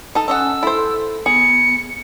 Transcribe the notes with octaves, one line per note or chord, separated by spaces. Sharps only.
D#4 A4
C#4 A4 D#5 F#5 G#5 E6
E4 A4 C5 C6
B3 G#4 C#7